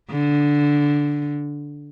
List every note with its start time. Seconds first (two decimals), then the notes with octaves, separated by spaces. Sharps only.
0.10 D3